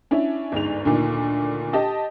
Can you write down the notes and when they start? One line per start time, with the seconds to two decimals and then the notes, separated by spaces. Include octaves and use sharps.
0.11 C#4 D4 E4
0.52 G1 D2 G#2 F7
0.85 D2 A#2 D#3
1.73 G4 D#5 A5